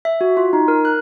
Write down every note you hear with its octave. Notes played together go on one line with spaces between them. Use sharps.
E5
F#4
F4
D#4
A#4
F#6